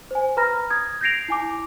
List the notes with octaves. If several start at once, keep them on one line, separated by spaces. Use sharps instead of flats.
C5 G#5
B4 A#5 B5 F6 A#6
D#6 G#6
G6 G#6 A#6 C7 D7 F7
E4 G#5 D6